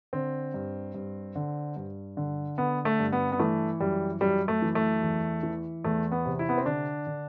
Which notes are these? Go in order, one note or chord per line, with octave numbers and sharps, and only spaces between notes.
D3 C4
G2
G2
D3
G2
D3
D3 B3
A3
G2
B3
B3
E3 A3
F#2 G3
F#2 G3
A3
E3
A3
E2
E3
E2 A3
B3
C3
E4
B3
C4
D3 D4
D3